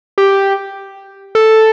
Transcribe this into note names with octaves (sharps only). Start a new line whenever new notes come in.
G4
A4